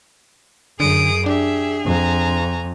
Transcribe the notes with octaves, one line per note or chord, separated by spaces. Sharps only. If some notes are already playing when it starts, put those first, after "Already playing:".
F#2 D3 G#4 D#6 D7
D4 G4 G#4 E5
F2 G#5 A#5